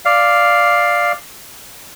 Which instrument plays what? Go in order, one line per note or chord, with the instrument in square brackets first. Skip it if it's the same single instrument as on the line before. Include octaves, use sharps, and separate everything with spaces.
[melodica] D5 F5